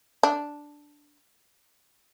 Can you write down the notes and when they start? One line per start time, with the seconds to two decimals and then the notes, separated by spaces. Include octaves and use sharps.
0.23 D4